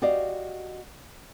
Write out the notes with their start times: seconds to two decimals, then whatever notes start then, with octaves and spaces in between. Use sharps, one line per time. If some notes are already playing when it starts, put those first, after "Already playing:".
0.02 F#4 G4 D5 D#5 F5